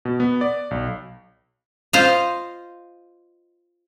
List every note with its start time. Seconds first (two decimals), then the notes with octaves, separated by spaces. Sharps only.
0.05 B2
0.20 B3
0.41 D5
0.71 B1
1.93 F4 C5 D#5 F5